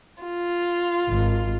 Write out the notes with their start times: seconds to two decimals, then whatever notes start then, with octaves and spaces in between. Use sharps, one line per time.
0.23 F4
1.09 G#1